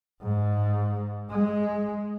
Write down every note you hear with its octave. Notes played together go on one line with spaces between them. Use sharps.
G#2
G#3